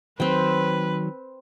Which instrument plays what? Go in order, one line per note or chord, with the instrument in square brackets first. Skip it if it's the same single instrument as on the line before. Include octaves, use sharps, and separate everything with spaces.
[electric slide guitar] D#3 F#3 [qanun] C4 G5 [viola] B4